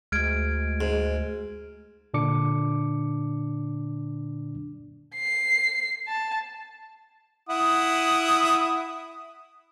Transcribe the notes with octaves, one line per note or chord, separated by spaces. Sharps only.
D2 G#3 F6 G#6 D7
G#2
A#2 D3 D4 D6 C#7
C7
A5
E4 F#5 D#6